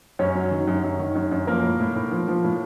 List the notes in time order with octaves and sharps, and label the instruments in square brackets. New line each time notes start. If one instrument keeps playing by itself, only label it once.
[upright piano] F#2 C#4 C#5
F#3
D#3
F#2
F#2
D#3
F#2
F#2
F3 A#3 A#4
A2
A2
A2
F3
F3
A2